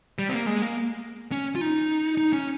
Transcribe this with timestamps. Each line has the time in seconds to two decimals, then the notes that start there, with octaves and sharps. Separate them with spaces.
0.19 G3
0.29 C4
0.33 A#3
0.46 G#3
0.62 A#3
1.32 C#4
1.55 F4
1.61 D#4
2.17 D#4
2.33 C#4